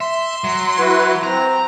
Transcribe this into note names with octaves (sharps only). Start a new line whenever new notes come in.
E5 C6
F#3
E4 F#4 B4
C4 A#5